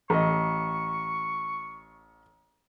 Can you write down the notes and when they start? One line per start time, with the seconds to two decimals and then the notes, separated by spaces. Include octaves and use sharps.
0.10 A1 D#5 C#6